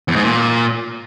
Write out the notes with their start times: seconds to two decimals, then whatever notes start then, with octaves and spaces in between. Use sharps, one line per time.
0.08 E2
0.16 G#2
0.23 A#2